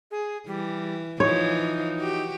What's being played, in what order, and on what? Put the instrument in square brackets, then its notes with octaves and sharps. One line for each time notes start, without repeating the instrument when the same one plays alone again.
[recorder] G#4
[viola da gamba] E3 [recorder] G3
[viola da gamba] E3 F3 [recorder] D#4 [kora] C#5
[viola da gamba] F#4 G4